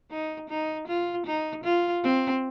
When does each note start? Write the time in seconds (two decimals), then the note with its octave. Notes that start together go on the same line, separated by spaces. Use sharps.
0.11 D#4
0.50 D#4
0.88 F4
1.26 D#4
1.64 F4
2.03 C4